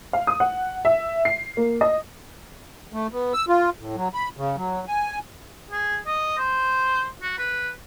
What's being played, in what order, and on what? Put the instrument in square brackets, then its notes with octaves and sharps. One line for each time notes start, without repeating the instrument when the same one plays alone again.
[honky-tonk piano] F5
D#6
F#5
E5
C7
A#3
D#5
[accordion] A3
B3
E6
F4
A2
F#3
B5
C#3
F#3
G#5
[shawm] G#4
D#5
C5
F#4
B4